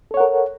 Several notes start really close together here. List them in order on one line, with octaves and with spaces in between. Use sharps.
A4 C#5 F#5 A#4